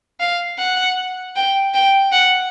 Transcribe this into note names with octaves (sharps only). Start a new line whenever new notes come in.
F5
F#5
G5
G5
F#5